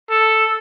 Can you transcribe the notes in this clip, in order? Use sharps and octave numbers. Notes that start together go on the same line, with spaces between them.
A4